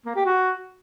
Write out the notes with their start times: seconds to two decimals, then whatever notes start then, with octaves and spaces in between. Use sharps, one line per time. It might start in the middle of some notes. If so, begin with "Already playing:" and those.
0.06 A#3
0.16 G4
0.26 F#4